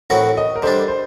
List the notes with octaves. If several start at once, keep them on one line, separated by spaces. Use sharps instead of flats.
A2 F#3 C4 F#4 A#4 F#5
D#5
A#4
D3 G3 D4 C5
C5